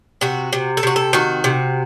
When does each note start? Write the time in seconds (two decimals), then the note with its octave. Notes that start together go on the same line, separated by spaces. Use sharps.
0.21 C3 F#4
0.53 C3
0.77 A4
0.83 C3 F#4
0.96 A4
1.13 D#3 F#4
1.44 C3